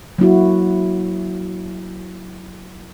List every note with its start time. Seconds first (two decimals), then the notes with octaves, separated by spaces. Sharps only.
0.18 F#3 A#3 E4 F#4